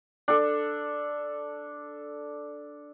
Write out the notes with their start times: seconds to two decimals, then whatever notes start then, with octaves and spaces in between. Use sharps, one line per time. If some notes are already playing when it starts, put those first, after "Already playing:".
0.28 D4 A4